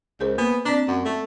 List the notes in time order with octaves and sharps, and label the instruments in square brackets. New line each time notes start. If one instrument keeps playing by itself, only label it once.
[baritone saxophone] C#2 [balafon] G#4 A#4 C5
[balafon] A#3 [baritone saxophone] B3
[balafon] C4 D5 A#5 [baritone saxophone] D4
[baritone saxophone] F#2 [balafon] F#5
[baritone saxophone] A3